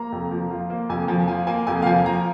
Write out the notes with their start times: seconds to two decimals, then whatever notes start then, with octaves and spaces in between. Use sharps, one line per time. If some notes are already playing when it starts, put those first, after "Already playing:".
Already playing: A#3 A#5
0.12 F2
0.31 F3
0.51 F4
0.70 A#3
0.89 F2 G#5
1.08 F3 G#5
1.28 F4 G#5
1.47 A#3 G#5
1.67 F2 G#5
1.82 F5
1.86 F3 G#5
2.05 F4 A#5